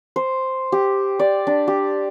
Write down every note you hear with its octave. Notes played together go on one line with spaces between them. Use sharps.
C5
G4
D5
D4
G4